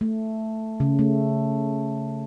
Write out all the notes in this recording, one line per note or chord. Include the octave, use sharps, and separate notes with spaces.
A3
C#3
A3